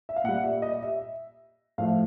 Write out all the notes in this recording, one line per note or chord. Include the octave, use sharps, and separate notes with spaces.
E5
F5
A#2 G3 F#5
E5
D#5
E5
A2 F3 A3 F5